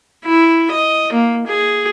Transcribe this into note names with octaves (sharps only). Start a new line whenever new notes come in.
E4
D#5
A#3
G#4